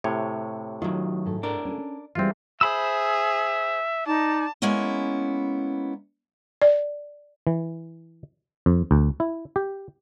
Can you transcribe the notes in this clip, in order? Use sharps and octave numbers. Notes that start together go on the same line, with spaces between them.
A2 C3 C#5
D#3 F#3 F4
G#2 A4
D4 A#4
C#4 A4
E3 G3 G#3 C4 F4
G#4 C5 E5 B5 E6
D#4 D5 A5
G#3 A#3 B3 C#4 E4
D5
E3
F2
D2
E4
G4